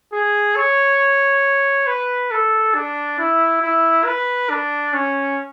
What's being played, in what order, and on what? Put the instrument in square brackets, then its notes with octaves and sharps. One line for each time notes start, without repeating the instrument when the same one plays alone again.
[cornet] G#4
C#5
B4
A4
D4
E4
E4
B4
D4
C#4